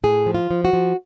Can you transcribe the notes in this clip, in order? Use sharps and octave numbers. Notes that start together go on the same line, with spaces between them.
A2 G#4
F3
F4
F3
F#4
F3